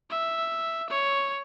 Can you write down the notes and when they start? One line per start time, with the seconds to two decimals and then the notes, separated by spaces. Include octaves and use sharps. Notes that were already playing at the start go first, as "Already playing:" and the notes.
0.10 E5
0.90 C#5